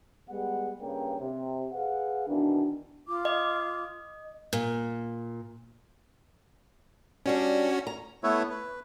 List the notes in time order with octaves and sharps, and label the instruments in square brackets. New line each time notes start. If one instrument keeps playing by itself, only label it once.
[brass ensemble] G3 G#3 B3 G#4 F#5
G2 C#3 A#3 B4 C#5 G5
C3
G#4 B4 F5 F#5
B2 D#3 E3 D4
[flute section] F4 D6
[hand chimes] D#5
[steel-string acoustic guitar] A#2
[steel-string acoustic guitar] G3 D4 [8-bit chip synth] C#4 F#4
[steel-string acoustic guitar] A#5
[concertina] A3 B3 E4 B4 C#5 E5
B4